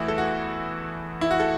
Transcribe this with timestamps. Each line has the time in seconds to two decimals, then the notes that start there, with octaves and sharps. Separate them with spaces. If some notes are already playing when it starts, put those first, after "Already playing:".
Already playing: E2 E3 A3 E4 F#4
0.08 A4
0.18 F#4
1.21 E4
1.31 F#4
1.40 A4